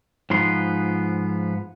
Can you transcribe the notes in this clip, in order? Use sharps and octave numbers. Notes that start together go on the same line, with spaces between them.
G#2 F3 B3 C6